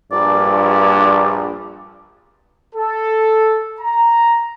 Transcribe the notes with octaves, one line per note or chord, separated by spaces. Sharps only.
A#1 G2 D5
A4
A#5